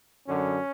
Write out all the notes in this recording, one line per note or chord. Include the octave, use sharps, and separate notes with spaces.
F#2 D3 F#3 C#4